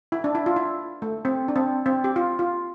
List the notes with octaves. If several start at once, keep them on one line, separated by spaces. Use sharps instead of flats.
E4
D4
E4
F4
E4
A3
C4
D4
C4
C4
G4
F4
F4